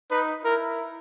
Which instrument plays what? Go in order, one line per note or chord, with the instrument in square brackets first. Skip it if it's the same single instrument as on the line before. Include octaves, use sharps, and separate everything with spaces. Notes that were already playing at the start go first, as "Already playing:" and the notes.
[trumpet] D#4 [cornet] B4
[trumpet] E4 [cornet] A#4